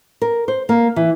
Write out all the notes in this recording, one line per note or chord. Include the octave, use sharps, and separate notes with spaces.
A#4
C5
A#3
E3